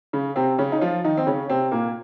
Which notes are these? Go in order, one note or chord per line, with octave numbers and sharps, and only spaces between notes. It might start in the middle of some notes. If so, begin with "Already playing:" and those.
C#3
C3 C4
C#3 C#4
D#4
F3 F4
D#3 D#4
C4
C#3 C#4
C3 C4
A#2 A#3